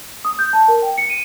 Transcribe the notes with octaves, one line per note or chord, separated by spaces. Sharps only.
D#6
G6
A5
A#4
G5
C#7
D#7